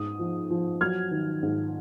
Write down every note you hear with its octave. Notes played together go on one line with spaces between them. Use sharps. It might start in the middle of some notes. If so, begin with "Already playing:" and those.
Already playing: G#2 D#6
F3
F3
F#3 F6 G#6
D#3
G#2